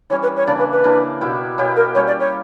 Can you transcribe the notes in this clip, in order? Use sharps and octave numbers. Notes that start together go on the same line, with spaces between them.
E3 G3 C#4 C#5
B4
C#5
C#3 E3 A#3 D4 D5
B4
B4
C#3 E3 A#3 D4
B2 A#3 E4 G4
B2 A#3 E4 G4 C#5
A#4
G3 C#4 G4 C#5
D5
C#5